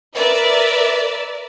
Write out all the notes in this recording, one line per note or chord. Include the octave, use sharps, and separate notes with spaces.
A#4 B4 D5 E5